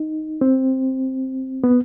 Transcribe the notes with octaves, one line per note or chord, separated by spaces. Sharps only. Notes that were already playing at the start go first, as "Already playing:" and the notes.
Already playing: D#4
C4
B3